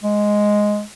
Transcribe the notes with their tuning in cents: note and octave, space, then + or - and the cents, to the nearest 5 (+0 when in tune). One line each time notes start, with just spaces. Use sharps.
G#3 +0